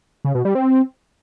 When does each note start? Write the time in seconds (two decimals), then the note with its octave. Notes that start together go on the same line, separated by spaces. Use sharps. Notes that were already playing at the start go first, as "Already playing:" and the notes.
0.25 C#3
0.35 B2
0.45 G3
0.55 C4